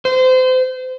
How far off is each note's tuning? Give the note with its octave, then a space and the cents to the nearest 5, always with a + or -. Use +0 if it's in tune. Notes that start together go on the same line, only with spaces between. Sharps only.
C5 -30